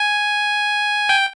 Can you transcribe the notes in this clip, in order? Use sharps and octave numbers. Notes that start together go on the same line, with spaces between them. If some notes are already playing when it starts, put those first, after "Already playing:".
Already playing: G#5
G5